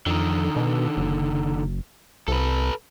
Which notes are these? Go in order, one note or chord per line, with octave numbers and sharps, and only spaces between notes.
F2 D3 D#3
B2
F#1
C2 A4 B4